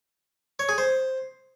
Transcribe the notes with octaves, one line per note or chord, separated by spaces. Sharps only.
C#5
G#4
C5